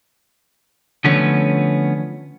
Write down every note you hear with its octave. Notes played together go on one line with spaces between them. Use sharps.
D3 F3 A3 B3 C#4